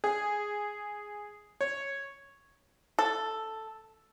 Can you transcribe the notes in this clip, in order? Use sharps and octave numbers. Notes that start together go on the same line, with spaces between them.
G#4
C#5
A4